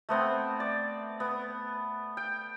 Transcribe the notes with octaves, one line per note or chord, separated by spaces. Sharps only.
A3 B3 C4
D5
B3
G5